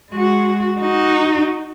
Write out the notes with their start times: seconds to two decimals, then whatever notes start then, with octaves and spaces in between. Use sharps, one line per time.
0.12 G#3 F#4
0.81 D#4 F#4